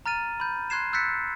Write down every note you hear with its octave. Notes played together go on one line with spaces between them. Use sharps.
A#5 F6 A6 D#7
B5 G6
C6 F#6 G#6 C7 E7
E6 F#6 G6 A6 B6 C#7